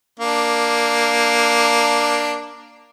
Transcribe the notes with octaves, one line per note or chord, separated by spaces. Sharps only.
A#3 D4